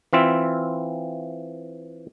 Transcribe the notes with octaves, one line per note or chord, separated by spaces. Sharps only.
E3 C4 F4 E5